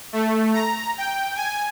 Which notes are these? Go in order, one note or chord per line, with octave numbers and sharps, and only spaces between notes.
A3
A#5
G5
G#5